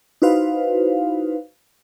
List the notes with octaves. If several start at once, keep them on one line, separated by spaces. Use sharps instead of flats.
D#4 E4 F#4 B4 C5 F5